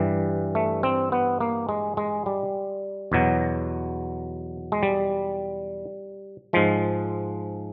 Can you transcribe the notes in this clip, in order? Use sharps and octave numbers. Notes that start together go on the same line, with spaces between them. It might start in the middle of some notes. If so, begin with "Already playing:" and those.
Already playing: G2 E3 G3
A3
C4
B3
A#3
G#3
G#3
G3
E2 B2 F#3
G#3
G3
G#2 F3 G#3